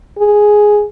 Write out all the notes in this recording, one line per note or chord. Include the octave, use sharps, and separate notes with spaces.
G#4